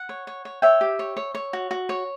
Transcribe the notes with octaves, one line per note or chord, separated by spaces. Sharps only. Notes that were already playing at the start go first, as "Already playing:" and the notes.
Already playing: F#5
C#5
C#5
C#5
C#5 E5 G5
G4
C#5
C#5
C#5
F#4
F#4
C#5